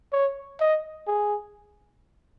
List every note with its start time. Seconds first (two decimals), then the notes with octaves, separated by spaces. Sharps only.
0.12 C#5
0.60 D#5
1.07 G#4